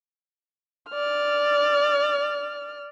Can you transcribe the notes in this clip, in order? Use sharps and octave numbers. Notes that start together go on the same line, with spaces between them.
D5 F6